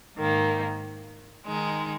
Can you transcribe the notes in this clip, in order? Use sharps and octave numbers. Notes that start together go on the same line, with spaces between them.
G#2 D#3 A#3
D#3 G#3 D#4